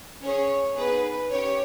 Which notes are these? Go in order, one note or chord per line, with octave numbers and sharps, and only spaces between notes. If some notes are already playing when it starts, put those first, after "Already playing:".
C#4 G#4 C#5
B3 D#4 G#4 B4
C#4 G4 C#5